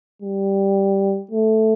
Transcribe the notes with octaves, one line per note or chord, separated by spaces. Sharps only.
G3
A3